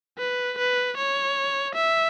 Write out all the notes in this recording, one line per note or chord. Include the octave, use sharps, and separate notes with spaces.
B4
B4
C#5
E5